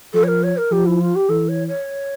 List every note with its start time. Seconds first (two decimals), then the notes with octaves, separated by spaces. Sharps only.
0.14 F3 A4
0.23 C#5
0.27 A#4
0.43 C#5
0.57 A#4
0.71 F3 G4
0.86 E4
1.00 F4
1.15 G4
1.29 E3 A4
1.48 C#5
1.68 C#5